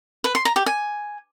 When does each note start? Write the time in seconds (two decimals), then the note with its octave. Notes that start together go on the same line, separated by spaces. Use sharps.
0.24 B4
0.35 C6
0.45 A#5
0.56 G4
0.66 G#5